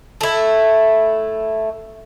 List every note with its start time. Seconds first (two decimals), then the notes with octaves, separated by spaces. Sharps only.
0.21 A3 E4